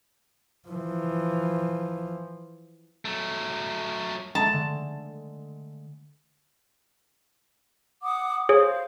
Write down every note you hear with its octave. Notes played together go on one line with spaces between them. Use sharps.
E3 F3
F#3 A3
G#3 A3 A5
D3 A3
F#5 D6 D#6
G#4 C5 C#5 F5